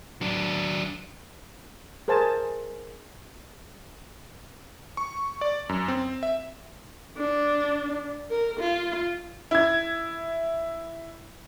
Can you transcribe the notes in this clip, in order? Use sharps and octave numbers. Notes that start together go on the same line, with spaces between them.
F#3 D4
G#4 A#4 C5 G#5 A5
C#6
D5
F#2
C4
E5
D4
A#4
F4
E4 G#6